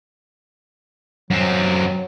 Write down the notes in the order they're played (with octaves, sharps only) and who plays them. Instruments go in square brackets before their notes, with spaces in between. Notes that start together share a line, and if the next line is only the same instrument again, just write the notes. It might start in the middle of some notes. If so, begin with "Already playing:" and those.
[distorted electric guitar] F#2 C4 [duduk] F#3